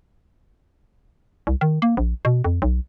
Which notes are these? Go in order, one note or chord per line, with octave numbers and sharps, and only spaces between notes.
C2
D#3
A#3
A#1
B2
F2
B1